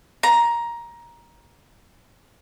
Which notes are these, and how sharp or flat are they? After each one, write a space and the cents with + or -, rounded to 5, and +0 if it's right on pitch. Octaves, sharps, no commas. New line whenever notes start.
A#5 +15